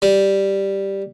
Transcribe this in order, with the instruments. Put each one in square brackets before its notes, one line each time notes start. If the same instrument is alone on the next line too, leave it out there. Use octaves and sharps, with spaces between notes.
[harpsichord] G3